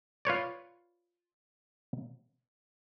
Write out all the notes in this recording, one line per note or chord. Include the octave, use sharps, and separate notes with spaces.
F4 B4 C#5 D5